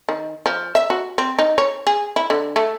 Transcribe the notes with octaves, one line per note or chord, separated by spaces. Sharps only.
D#3
F3
E5
F#4
C4
D#4
C#5
G#4
E4
D3
A3